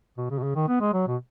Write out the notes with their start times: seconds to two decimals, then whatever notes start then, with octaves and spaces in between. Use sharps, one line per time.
0.18 B2
0.30 C#3
0.39 B2
0.43 C#3
0.56 D#3
0.68 B3
0.81 G#3
0.94 F#3
1.07 B2